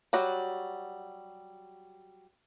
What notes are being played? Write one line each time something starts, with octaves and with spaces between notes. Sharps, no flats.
F#3 G3 F#4